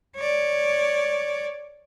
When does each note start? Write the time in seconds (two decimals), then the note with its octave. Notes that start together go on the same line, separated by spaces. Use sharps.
0.15 C#5 D5